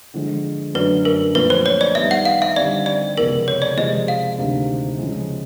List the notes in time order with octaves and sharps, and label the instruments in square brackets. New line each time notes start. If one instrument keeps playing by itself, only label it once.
[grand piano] D3 F3 G#3
[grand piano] F#2 D3 F#3 A3 D4 [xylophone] B4
[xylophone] A#4
[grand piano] A#2 F3 A3 C4 F4 [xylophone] B4
[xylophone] C5
C#5
D5
[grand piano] D#3 G3 B3 D#4 [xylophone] E5
[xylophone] F#5
F5
E5
[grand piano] D3 G3 C4 D#4 [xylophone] D5
[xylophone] D5
[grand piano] C#2 C3 F3 G#3 B3 [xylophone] A#4
[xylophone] C#5
D5
[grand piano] C3 F3 G#3 [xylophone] D#5
[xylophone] F5
[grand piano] D2 C3 D#3
C#3 F3 G#3